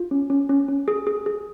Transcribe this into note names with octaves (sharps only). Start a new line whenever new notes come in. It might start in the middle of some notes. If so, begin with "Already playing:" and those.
Already playing: F4
C#4
C#4
C#4
C#4
G#4
G#4
G#4